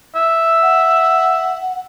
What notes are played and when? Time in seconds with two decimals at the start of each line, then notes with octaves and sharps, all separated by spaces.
0.15 E5
0.62 F#5